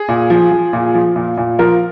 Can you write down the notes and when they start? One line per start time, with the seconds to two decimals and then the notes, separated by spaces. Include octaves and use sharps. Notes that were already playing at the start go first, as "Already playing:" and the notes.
Already playing: G#4
0.09 A#2
0.30 F3
0.52 F3
0.73 A#2
0.94 F3
1.16 A#2
1.37 A#2
1.59 F3 A#4